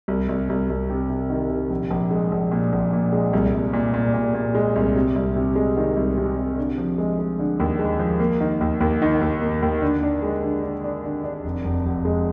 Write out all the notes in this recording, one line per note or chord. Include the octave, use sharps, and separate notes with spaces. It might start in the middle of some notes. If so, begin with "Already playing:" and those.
C2
C2
C2
C2
C3
C3
D#3
C3
A#1
A#1
G#3
A#1
A#2
A#1
A#2
G#3
C2
C2
A#2
A#2
A#2
A#2
G#3
C2
C3
C2
C3
G#3
D#3
C2
C3
C3
D3
F3
G#3
G#3
D3
D#2
G#3
F3
A#3
D#3
D#2
D#2
D#3
D#2
A#3
D#2
D3
D4
G#3
D3
D3
D4
D3
D4
F1
F1
F1
G#3